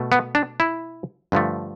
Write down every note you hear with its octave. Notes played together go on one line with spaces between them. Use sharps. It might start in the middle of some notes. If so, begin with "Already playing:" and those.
Already playing: B2 A3
B3
D4
E4
G2 D3 F3 A3